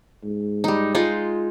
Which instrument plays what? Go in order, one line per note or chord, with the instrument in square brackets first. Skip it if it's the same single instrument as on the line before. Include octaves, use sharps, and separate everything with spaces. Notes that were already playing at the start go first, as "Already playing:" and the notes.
[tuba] G#2
[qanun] G3 D#4
G#3 D#4 F4